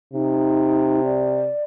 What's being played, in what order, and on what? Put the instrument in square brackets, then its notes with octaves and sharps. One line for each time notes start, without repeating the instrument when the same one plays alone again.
[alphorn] C3 [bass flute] D#4
[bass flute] D5